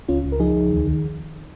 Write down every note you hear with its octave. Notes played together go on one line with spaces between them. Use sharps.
C#2 C#4 F4
C#2
A#4
F3 D#4 G#4
C#2
D#2
D#3